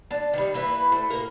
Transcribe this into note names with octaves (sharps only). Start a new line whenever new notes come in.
D4 A5
D#3 F#3 G3
E3 A#3 E4 B4
A3 C4
A2 A#3 A#4